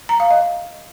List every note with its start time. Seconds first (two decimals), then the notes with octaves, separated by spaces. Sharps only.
0.09 A#5
0.20 F5
0.31 D#5